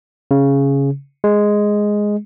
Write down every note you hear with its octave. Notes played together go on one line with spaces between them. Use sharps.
C#3
G#3